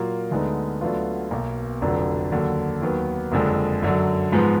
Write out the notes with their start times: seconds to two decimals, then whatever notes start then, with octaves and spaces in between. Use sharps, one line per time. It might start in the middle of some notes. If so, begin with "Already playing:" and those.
Already playing: A#2 F#3 A#3 F4
0.31 D2 D3 G#3 B3 D#4
0.81 D2 D3 F#3 B3 F4
1.31 B1 B2 A#3
1.81 F1 F2 D3 F#3 D4
2.32 D#2 D3 F#3
2.81 D#2 D#3 F#3 B3
3.32 F#1 F2 D3 G#3
3.82 F#2 D3 F#3
4.32 G#2 F3 G#3 B3